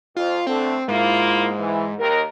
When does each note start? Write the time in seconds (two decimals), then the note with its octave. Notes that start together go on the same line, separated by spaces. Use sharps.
0.17 F2 F4
0.47 D3 A3 C4
0.88 G#2 A#3 E4 F4
1.59 E3
1.99 D#2 A#4